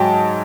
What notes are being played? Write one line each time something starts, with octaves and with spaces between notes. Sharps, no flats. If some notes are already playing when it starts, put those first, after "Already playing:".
Already playing: G#2 F#3 G5 A5